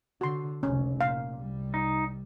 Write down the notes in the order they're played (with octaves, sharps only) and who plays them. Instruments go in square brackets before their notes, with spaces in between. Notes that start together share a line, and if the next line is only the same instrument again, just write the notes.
[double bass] D3 [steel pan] F#4 C6
[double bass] F1 C#2 [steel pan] C#4
[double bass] A#2 [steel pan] F5
[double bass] C2 G3
[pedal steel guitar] D#4